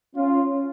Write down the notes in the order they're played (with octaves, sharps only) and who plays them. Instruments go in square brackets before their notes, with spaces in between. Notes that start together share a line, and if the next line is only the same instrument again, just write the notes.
[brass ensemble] C#4 F4